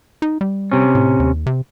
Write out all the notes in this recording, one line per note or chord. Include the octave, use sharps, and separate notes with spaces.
D#4
G3
C3 C#4
A2
D#2
C3